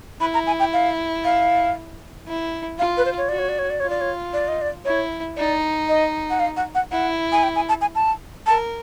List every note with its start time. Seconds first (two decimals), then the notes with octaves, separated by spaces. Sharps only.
0.21 E4 B5
0.34 A#5
0.47 G#5
0.60 G5
0.73 F5
1.25 F5
2.27 E4
2.78 F4 F5
2.97 B4
3.05 C5
3.18 C#5
3.29 F#4 D5
3.39 C#5
3.49 D5
3.59 C#5
3.70 D5
3.80 F4 C#5
3.90 D5
4.01 C#5
4.33 D5
4.48 D#5
4.62 D5
4.85 E4 C#5
5.37 D#4 D5
5.89 D#5
6.30 F#5
6.40 F5
6.57 F#5
6.75 F#5
6.91 E4 F#5
7.32 G#5
7.43 G5
7.56 G#5
7.69 A5
7.81 G#5
7.95 A5
8.46 A#4 A5